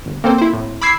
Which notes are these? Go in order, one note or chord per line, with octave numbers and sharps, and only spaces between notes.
G1
A#3 C4 A4 C5
E4 C5
A2
B5 D6 E6 G#6 C7